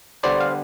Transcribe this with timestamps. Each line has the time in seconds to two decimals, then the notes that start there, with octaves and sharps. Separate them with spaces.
0.23 D3 G3 B3 D4 C5 D5
0.41 F5